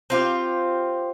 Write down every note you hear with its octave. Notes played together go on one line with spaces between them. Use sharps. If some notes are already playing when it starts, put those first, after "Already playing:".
C4 F4 G4